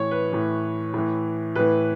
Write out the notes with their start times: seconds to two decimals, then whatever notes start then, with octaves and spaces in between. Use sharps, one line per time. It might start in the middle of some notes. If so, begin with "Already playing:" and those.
Already playing: A2 E3 C#5
0.11 B4
0.32 A2 E3
0.94 A2 E3
1.56 A2 E3 B4